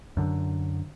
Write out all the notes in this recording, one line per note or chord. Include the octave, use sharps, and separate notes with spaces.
F#2 D3